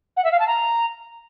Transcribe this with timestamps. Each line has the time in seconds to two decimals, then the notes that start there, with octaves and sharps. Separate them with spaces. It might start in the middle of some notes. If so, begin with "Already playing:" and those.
0.17 F#5
0.24 E5
0.32 F5
0.40 A5
0.47 A#5